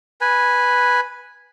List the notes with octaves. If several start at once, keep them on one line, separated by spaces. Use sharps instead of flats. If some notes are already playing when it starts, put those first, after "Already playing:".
B4 G#5